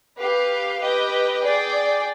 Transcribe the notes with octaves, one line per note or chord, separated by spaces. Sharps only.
G4 B4 F5
G4 B4 D#5 G5
G#4 D5 G5